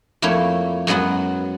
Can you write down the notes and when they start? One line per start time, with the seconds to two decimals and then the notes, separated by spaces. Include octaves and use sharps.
0.22 F2 A3 A#3 E4 C#5
0.87 F#2 F#3 G#3 B3 F#4